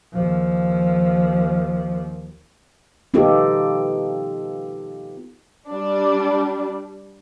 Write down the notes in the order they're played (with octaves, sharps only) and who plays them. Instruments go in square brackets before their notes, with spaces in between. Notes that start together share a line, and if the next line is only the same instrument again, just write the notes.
[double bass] D#2 F3
[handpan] B3 D#4 F4 G4 A4
[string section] G3 D4